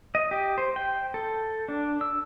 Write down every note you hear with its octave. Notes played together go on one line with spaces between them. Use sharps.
D#5
G4
C5
G5
A4
D4
E6